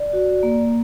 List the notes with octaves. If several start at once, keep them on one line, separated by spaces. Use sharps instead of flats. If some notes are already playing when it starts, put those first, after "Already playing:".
Already playing: D5
F#4
A#3